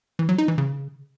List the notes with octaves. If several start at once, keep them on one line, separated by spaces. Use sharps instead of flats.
E3
F#3
D#4
E3
C#3